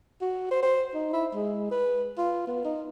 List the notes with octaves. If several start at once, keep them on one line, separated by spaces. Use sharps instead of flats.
F#4
C5
C5
D#4
E4
G#3
B4
F4
B3
D#4